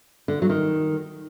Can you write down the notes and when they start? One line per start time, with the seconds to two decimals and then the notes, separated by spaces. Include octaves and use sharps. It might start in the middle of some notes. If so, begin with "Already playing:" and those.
0.28 D3
0.42 F#3
0.49 D#3